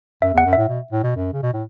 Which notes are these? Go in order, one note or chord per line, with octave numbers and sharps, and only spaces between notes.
F#2 E5
E2 F#5
F#2
A2 E5
B2
A2
B2
F#2
C#3
B2
A2